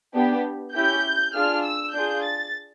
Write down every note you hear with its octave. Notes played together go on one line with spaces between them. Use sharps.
B3 D4 G4
C#4 E4 G4 G6
D4 F4 G#4 F6
E6
D4 F4 G#4 G6
A6